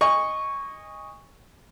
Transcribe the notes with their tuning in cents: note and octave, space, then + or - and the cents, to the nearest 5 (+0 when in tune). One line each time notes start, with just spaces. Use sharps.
D#5 +0 G#5 -25 C#6 +0